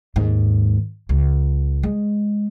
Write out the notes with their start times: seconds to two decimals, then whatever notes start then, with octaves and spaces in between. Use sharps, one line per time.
0.16 D#2 G#2
1.09 C#2
1.83 G#3